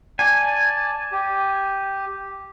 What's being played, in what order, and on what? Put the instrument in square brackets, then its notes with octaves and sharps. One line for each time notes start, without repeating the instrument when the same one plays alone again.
[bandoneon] D5 A5 [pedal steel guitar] G#5
[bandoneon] G4